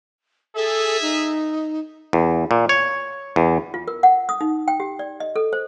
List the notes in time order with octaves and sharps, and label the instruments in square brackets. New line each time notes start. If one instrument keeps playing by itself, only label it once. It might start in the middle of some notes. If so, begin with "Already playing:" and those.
[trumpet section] G#4 E5 [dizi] A4
[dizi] D#4
[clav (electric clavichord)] E2
A#2
C#5
E2
[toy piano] F4
A#4
F#5
D#6
D#4
G5
G4
D5
D#5
A4
C5